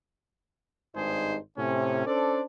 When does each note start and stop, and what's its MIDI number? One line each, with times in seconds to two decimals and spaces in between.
0.95 1.37 32
0.95 1.37 43
0.95 1.37 56
0.95 1.37 63
0.95 1.37 68
0.95 1.37 72
1.57 2.03 45
1.57 2.03 48
1.57 2.03 61
2.06 2.42 61
2.06 2.42 62
2.06 2.42 69
2.06 2.42 72
2.06 2.42 74